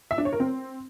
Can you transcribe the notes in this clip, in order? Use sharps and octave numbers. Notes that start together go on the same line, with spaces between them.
E5
D4
C#5
A#4
C4